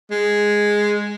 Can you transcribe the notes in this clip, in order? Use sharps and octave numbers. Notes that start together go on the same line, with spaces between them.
G#3